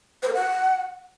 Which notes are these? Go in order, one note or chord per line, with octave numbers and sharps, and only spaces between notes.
C5
A#4
F#5